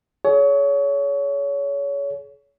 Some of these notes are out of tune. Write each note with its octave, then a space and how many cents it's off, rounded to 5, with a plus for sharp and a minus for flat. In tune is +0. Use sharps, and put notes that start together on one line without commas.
G#4 +40 C#5 +25